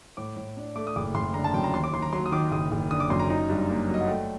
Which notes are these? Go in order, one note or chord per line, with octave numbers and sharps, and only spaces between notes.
A2 D6
A2
D4
A3 D6
D#6
F#1 D6
F#1 C6
D3 A#5
A5
F#2 G5
A#5
D#2 C6
D6
D#2 C6
A#5
F#3 C6
D#6
D#3 D6
F#1 D#6
F#1
D3 D#6
D6
F#2 C6
A#5
D#4 A#5
G2
A#3
F#3
D#5
F#5
A3 G5